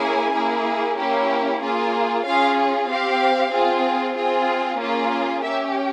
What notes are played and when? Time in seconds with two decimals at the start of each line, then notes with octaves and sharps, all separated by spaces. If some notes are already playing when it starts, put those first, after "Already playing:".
Already playing: A#3 C#4 E4 G#4 G#5
0.35 A#3 E4 G#4
0.98 A#3 C#4 E4 G4
1.62 A#3 F4 G#4
2.26 C#4 F4 G#4 F5
2.89 C4 G4 F5
3.52 C4 F4 G#4
4.16 C4 F4 G#4
4.80 A#3 C#4 F4 G#4
5.44 C#4 G4 E5